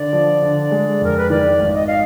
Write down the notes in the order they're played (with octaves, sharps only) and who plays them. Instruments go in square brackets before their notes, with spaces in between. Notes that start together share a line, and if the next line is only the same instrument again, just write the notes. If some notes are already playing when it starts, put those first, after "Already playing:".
Already playing: [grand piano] D3 [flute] D5
[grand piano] F3
D3
G#3
[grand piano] F2 [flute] A#4
[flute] B4
[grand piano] D#3 [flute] D5
[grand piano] G#1
[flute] D#5
F5